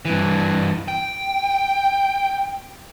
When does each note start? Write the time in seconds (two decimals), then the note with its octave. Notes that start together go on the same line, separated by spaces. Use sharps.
0.05 G2 E3
0.88 G5